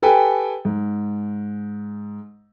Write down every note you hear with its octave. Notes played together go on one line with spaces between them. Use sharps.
G4 A4 B4 G5 G#5
G#2